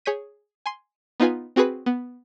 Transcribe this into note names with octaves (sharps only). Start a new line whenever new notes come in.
G#4 C#5 G6 B6 D#7
G#5 C6
B3 D#4 F4 B4 G#5
C4 F#4 G#4 B4 B6
B3